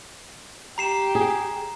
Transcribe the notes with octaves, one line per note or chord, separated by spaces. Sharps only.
G4 A#5 C7 E7
G#4